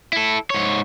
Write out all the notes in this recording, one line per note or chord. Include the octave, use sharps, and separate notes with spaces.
E4 A4
G#2 C#5